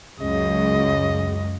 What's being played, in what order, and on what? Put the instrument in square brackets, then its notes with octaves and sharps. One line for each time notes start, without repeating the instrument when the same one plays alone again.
[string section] C#2 F#2 [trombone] C#3 [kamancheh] D#5